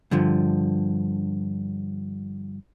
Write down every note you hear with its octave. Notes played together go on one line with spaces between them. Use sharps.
G2 D3 F3